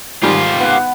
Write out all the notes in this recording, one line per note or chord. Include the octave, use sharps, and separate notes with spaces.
G#2 D#3 G3 F4 G4
B3 F#5